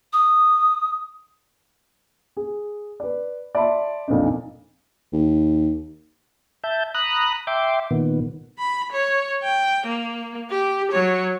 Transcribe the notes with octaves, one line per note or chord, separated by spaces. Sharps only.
D#6
G#4
B4 D5
D5 E5 A5 B5 C6
B1 F2 A#2 D4 D#4
D#2
E5 A5 G6
A#5 B5 D#6 F#6
E5 G5 C6 D6
A#2 D#3 B3
B5
C#5
G5
A#3
G4
F#3 C#5